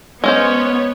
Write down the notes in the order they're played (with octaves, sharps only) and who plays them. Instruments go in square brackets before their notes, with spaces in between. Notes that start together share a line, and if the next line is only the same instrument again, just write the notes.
[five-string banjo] G#3 C#4 C5 [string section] B3 C#5